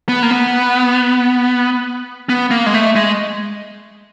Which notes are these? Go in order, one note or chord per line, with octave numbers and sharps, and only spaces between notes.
B3
A#3
B3
B3
A#3
G#3
A3
G#3